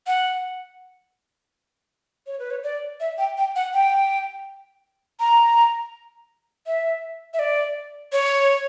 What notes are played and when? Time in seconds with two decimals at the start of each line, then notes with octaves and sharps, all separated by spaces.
0.07 F#5
2.27 C#5
2.39 B4
2.51 C#5
2.64 D5
3.00 E5
3.18 G5
3.37 G5
3.56 F#5
3.73 G5
5.20 A#5
6.66 E5
7.33 E5
7.39 D5
8.12 C#5